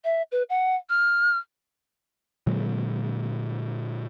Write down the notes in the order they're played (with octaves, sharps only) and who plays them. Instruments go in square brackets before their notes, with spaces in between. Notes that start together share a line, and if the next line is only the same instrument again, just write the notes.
[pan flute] E5
B4
F#5
F6
[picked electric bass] A#2 D3 F#3 G#3